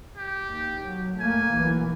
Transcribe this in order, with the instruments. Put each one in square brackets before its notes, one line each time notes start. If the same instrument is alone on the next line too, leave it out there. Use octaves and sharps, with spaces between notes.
[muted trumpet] G4
[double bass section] D#2
F#3
[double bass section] F#2 A3 A#3 [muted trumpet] G#5
[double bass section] B1 E3